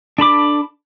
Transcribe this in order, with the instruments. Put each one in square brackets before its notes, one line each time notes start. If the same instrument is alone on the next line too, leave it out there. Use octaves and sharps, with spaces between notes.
[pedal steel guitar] D4 A4 B5 D6